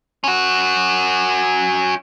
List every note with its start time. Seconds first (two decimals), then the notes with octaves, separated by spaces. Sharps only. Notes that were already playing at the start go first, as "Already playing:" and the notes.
0.24 C#4 F#4